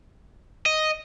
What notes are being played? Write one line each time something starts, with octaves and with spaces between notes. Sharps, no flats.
D#5